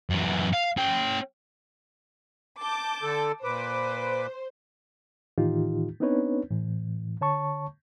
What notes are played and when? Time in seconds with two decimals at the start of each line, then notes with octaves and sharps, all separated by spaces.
0.10 F#2 E3
0.53 F5
0.77 C#4 G5
2.60 A5 D6 G6
3.02 D3 A4
3.44 A#2 B4 C5 D6
5.38 A2 D#3 E3 D#4 F4 G4
6.00 B3 C4 D4 D#4 B4 C#5
6.50 A2 E3
7.21 D3 C#5 A5 C#6